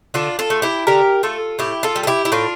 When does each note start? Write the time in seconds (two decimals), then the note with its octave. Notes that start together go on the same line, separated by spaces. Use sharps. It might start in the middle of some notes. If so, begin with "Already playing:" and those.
0.14 D3 D4 F4
0.39 F4 A4
0.50 A3
0.62 E4 G4
0.87 D3 G4 A#4
1.23 A3 F4 A4
1.59 A2 E4 G4
1.83 F4 A4
1.96 G3
2.03 A4
2.07 E4 G4
2.25 E4
2.32 A2 D4 F4